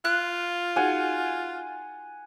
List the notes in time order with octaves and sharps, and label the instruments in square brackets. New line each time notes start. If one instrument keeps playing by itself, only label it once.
[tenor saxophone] F4 [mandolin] F#6
[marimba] D#4 F#4 G#4 [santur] F#5 G#5